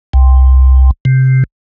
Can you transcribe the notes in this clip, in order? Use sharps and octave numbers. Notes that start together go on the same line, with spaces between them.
C2
C3